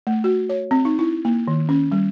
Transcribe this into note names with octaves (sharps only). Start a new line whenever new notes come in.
A3
F#4
C#5
C4
D#4
E4
A#3
D#3
C#4
G3